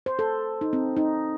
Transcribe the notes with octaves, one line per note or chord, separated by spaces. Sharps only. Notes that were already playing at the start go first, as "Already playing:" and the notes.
C5
A4
D#4
C4
D#4